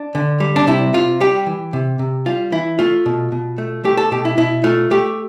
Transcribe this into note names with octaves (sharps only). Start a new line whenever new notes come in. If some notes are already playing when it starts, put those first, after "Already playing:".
Already playing: D4
D3
G3
D4
C3 E4
C3 F4
G3 G4
E3
C3
C3
G3 F4
E3 E4
A3 F4
B2
B2
A3
A3 G4
A4
B2 G4
E4
B2 E4
A3 F4
A3 G4